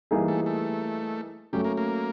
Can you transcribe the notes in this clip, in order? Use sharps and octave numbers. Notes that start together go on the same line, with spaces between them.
E3 G3 A#3 D#4 G#4
A3
A3
F#3 G3 A3 C#4
A#3
A#3